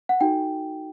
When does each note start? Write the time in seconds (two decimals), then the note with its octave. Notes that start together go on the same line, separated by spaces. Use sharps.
0.09 F#5
0.21 D#4 F#4 A4 G5